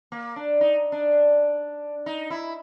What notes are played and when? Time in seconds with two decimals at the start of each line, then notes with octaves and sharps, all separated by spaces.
0.12 A#3
0.36 D4
0.61 D#4
0.92 D4
2.06 D#4
2.30 E4